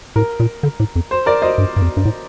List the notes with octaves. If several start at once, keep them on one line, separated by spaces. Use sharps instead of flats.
A2 A#4
A#2
D3
A2
F2
C5
A#4 D5
C5 D#5
G2
G2
F2
G2
A2